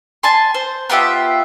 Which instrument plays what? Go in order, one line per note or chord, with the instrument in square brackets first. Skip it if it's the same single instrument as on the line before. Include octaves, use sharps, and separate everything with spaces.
[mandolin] G#5 A5 C6
C5
B3 F4 G4 E5